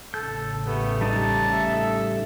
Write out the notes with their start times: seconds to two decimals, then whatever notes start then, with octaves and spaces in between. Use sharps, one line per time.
0.14 A1 C#3 A4 G6
0.66 A3 B3 G4
1.01 G3 D#4 A5
1.48 A4 E5